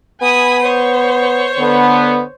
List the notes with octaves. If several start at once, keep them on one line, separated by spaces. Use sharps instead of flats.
B3 G#5 B5 D#6
C5 C#5
D3 B3